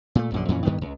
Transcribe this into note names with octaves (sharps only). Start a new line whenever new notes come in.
A#2 A3
A#1 F#2 D3
F2 A#2 E3 C#4
D2 G2 D#3 B3
C#2